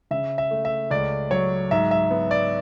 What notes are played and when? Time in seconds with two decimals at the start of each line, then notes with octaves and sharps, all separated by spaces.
0.11 C#3 E5
0.38 E5
0.51 A3
0.65 E5
0.91 C#2 D5
1.31 F#3 C#5
1.71 G#2 E5
1.91 E5
2.11 B3
2.31 D5